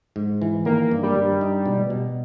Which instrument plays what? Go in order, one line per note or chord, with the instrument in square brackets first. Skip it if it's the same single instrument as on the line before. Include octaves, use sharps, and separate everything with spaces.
[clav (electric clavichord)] G#2
E3
[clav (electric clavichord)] D#3 [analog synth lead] A#3
[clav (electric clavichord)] G2
[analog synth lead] G3
[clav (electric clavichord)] G2
D#4
B2
B2